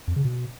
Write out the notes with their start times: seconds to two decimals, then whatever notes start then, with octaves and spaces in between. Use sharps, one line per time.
0.08 F2
0.16 C#3
0.25 B2